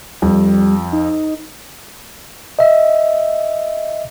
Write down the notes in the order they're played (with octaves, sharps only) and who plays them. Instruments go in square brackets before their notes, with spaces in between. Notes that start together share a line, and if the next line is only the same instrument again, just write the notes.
[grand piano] F2 [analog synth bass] G3
[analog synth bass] D#4
[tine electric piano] D#5 E5